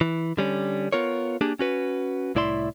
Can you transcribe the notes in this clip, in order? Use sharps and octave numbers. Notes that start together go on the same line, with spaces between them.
E3
D3 G3 C#4
B3 F4 A#4 C#5
A#3 D4 G4 G#4
C#4 F#4 B4
C2 A2 E4 D5 E5 C6